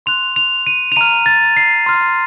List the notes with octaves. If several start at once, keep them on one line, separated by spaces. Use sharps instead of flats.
C6 F#6 F7
F7
D#7
F7
A#5 F6 D#7
A6
C7
C6 F6